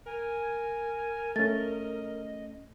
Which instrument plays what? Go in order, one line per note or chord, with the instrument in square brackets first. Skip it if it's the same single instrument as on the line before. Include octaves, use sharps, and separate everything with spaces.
[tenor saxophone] A#4 [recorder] G#5
[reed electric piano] A3 C#4 [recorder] D#5 [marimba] A6